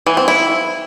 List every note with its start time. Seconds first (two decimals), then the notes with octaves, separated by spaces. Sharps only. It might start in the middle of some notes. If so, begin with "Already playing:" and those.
0.07 E3
0.17 C4
0.28 E4